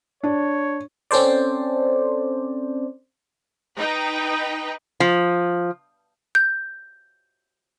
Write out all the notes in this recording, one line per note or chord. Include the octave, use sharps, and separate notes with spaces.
D4 C#5
C4 C#4 A4 C5 D5
D#4 B4 G5
F3
G6